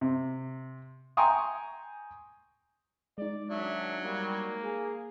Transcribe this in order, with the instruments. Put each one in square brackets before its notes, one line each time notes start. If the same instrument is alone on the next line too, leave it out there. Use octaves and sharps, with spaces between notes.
[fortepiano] C3
G5 G#5 A#5 C6 C#6 D#6
[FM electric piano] G#3 D#4 [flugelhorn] D5
[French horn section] D#3 C#4 D4 [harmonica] F#3 [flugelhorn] E5
[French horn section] G3 [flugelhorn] A#3
[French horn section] G#4